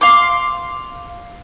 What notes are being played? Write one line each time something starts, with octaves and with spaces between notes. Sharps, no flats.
F5 C6 D6